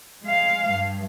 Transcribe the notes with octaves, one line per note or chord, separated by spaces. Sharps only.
G#3 F5
G2